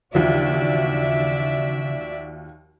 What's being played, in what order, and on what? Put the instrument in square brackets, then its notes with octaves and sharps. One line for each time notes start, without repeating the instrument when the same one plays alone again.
[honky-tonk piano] D#2 F3 [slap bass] C#3 E3 D4 [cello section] F#4 D5 E5